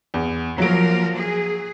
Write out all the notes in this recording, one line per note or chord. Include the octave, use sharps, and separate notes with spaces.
E2
F3 F#3 A#3 A#4 D7
G#4